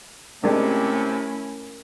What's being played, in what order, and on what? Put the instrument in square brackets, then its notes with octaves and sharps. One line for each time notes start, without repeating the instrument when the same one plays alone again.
[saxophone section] C3 [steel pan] G#3 D4 [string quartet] A3 C#4 E4 [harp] A#4